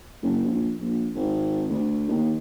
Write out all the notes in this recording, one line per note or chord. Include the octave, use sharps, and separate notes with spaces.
F#1
A#1
A#1
G#1
D2
D#2